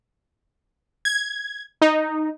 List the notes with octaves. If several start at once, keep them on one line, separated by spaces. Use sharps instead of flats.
G#6
D#4